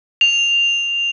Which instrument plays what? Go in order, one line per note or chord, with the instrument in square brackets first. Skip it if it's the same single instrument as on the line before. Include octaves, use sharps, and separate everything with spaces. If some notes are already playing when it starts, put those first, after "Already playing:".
[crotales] F7